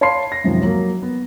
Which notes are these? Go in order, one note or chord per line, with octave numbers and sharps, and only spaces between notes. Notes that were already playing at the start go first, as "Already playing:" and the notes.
C#5 F5 A5 B5 C6 C7
A#6
F#2 C3 D#3 F3
F#3 A#3
B3